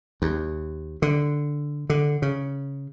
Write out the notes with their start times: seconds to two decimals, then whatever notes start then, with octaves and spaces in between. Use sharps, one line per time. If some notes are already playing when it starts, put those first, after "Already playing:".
0.22 D#2
1.02 D3
1.90 D3
2.22 C#3